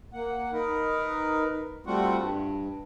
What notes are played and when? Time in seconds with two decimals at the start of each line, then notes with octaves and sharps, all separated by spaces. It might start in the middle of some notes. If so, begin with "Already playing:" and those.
0.13 A#3 F#5
0.53 D#4 A#4 B4
1.87 G3 A3 C4 F4 F#4 F#5
2.18 G2